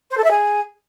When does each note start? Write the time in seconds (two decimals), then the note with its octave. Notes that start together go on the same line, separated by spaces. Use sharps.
0.10 C5
0.17 A4
0.24 E5
0.30 G#4